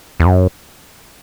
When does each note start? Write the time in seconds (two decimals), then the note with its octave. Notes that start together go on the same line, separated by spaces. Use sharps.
0.20 E2
0.26 F#2